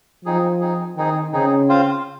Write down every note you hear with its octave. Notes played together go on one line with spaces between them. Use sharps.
F3 C4 D#4 G#4
C4 D#4 G#4
D#3 C4 D#4 G#4
C#3 C4 D#4 G#4
C4 F4 C5 F5